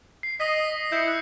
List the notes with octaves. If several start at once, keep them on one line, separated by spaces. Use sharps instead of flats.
C7
D#5 D#6 A#6 B6
E4 G6 C7 C#7
F#6